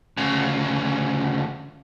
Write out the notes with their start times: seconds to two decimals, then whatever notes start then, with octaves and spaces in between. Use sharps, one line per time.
0.17 D2 C#3